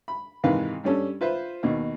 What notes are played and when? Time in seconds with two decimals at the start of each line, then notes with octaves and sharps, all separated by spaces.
0.08 B5
0.44 G#2 C3 D#3 E3 B4 F5
0.84 G2 G3 C#4 A4
1.21 F4 B4 C5 E5
1.63 D#2 B2